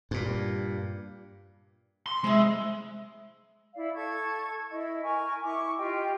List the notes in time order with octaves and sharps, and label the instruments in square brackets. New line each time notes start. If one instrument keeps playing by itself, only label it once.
[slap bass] G2 A#2
[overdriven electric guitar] C6
[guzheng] C3 E4 [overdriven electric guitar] G#3
[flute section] E4 D5 F5
A4 C#6 G#6
E4 D#5
A#4 G#5 C#6
E4 C#6 D6
F4 G4 D#5 G5